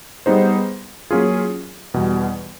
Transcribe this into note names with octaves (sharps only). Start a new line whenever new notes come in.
G3 B3 D#4 G#4 C5
F#3 A#3 C#4 F4 G#4
E2 B2 G3